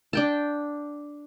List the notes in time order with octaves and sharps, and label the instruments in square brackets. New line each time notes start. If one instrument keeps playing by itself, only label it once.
[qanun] D4 G5 A5